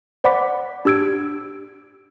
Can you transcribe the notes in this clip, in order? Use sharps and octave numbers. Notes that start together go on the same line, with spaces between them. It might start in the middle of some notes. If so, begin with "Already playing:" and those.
C5 D5 F#5 B5 D6 B6
D4 G4 E6 G#6 D7